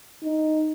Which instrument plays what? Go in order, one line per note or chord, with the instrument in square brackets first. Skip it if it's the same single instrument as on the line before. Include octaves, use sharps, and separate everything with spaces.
[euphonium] D#4